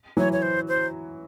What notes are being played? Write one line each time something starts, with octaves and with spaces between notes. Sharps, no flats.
E3 F#3 C#5
C#5
C5
C5